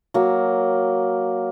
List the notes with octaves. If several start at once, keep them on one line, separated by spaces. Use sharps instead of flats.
F#3 A#3